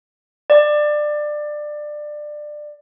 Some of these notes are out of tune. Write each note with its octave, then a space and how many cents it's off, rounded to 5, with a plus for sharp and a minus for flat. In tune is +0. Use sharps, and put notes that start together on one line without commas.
D5 +20